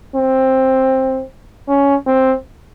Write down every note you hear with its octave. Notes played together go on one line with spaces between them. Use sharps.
C4
C#4
C4